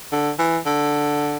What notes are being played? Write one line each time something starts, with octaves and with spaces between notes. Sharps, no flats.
D3
E3
D3